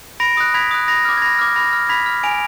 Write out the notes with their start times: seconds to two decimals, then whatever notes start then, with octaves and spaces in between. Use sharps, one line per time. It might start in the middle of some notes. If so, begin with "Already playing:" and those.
0.20 B5 A#6 D7
0.37 D#6 F#6
0.54 B5 G#6 B6
0.71 D#6 F#6
0.88 B5 A#6
1.05 D6 F6
1.17 G#6
1.22 B5 A#6
1.39 D6 F6
1.56 B5 A#6
1.73 F6
1.89 B5 G#6 B6
2.06 F6
2.23 G#5 D7 F7